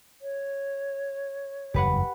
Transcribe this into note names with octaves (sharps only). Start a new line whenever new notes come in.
C#5
F#1 E2 G2 G4 B4 F#5